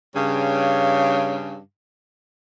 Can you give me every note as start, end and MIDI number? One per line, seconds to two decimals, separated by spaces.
0.15 1.58 43
0.15 1.58 49